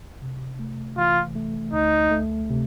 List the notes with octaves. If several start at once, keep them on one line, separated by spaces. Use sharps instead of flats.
C3
A3
E3 F4
A3
D2 D#4
A3
C3